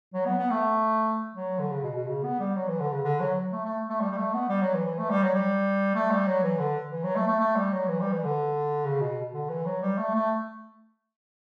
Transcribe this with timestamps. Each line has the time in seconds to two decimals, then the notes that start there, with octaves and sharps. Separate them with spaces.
0.14 F#3
0.26 B3
0.38 B3
0.50 A3
1.35 F#3
1.59 D3
1.71 C#3
1.83 B2
1.95 B2
2.07 C#3
2.23 B3
2.40 G3
2.56 F#3
2.68 E3
2.80 D3
2.92 C#3
3.04 D3
3.20 F#3
3.52 A3
3.65 A3
3.89 A3
4.01 G3
4.11 G3
4.17 A3
4.33 B3
4.49 G3
4.61 F#3
4.74 E3
4.86 E3
4.98 A3
5.09 G3
5.22 F#3
5.34 G3
5.95 A3
6.11 G3
6.27 F#3
6.43 E3
6.59 D3
6.92 E3
7.03 F#3
7.16 A3
7.28 A3
7.40 A3
7.56 G3
7.72 F#3
7.88 E3
8.00 G3
8.12 E3
8.24 D3
8.85 C#3
9.01 B2
9.33 D3
9.49 E3
9.66 F#3
9.82 G3
9.98 A3
10.14 A3